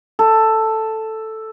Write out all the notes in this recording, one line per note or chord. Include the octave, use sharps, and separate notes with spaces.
A4